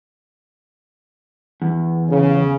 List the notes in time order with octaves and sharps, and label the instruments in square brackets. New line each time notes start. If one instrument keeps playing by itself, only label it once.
[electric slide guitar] E2
[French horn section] C#3